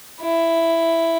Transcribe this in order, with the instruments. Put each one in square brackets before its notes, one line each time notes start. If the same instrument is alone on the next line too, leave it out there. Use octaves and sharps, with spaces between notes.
[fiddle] E4